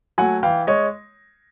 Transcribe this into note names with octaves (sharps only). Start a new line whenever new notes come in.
F#3 A3 F#5 G#5
E3 F5 G5
G#3 C#5 D#5